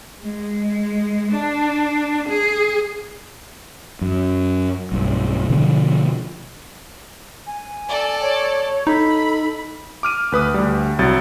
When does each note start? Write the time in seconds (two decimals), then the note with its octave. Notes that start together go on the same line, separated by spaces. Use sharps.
0.22 G#3
1.30 D4
2.28 G#4
4.01 F#2
4.92 B1 G2
5.50 B2 D3 F3
7.47 G#5
7.89 A4 D5
8.22 C#5
8.87 D#4 A4 B5
10.03 D6 F6 D#7
10.32 D2 B4 D#6
10.54 D2 G3
10.99 C2 F#3 A6